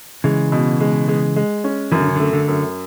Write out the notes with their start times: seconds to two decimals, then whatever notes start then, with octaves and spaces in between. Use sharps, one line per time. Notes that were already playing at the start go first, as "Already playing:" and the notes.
0.24 C#3 E3 G#3
0.52 B2
0.80 G#3
1.08 G#3
1.36 G#3
1.64 C#4
1.92 F#2 E3
2.01 D3
2.08 C#3
2.16 D3 A3
2.33 D3
2.48 F#2